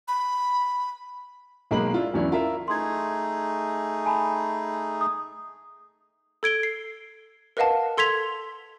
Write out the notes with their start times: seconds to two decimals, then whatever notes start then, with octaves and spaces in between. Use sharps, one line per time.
0.08 B5
1.71 B1 G#3 A#3 A#5 B5 F#7
1.94 D4 E4 F4
2.14 E2 F#3 C#4 D4 E4
2.31 E4 F4 A#4 E5
2.68 A3 D#4 G#4 C6 G#6
4.06 G#5 A5 B5
5.01 D#6
6.43 A4 G#6 D7 G7
6.63 C7
7.57 A#4 B4 D#5 F5 F#5 A5
7.97 A4 C6 G#6 B6 F7